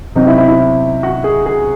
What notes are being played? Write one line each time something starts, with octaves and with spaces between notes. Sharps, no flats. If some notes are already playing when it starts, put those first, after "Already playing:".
C3 F#3 C4 D#4
E4
E4
E4
F#4
G#4
G#4